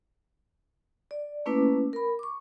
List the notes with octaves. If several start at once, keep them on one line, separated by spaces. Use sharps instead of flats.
D5
A3 A#3 C#4 E4 B4 D6
A#4 B5
C#6 D6